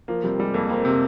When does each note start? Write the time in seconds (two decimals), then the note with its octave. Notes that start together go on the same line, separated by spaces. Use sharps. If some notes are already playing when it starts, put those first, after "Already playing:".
0.08 F3 A#3
0.24 C3 G3
0.39 G3 G#3
0.54 F2 A#3
0.69 A#3 C4
0.85 C3